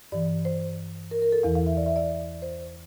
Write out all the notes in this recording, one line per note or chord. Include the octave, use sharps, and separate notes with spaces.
G2 E3 D5
C5
A#4
A#4
A4
E2 E3 F5
F5
E5
D5
E5
D5
C5